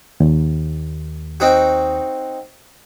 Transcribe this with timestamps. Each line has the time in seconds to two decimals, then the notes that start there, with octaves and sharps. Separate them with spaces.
0.20 D#2
1.40 C4 D#4 F#4